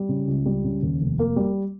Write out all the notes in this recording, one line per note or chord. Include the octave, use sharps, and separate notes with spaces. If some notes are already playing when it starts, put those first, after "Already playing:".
Already playing: G3
C#3
C#2
G3
C#3
D#2
F1
A#3
G3